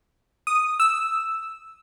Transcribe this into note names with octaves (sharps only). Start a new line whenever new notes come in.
D#6
E6